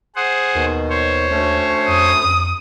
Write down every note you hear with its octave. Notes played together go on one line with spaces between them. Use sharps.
G#4 C5 F#5
D#2 B2 D#3
C5 C#5
D2 A3 C#4
F2 D#6
F2